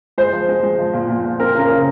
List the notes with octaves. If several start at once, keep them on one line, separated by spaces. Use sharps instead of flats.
G#3 C5
F3
G#3
G#3
F3
A#2
A#2
A#2
C4 A#4
C#3 A#4
C#3